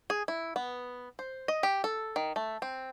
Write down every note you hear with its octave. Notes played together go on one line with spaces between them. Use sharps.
G#4
E4
B3
C5
D#5
G4
A4
D#3
A3
C4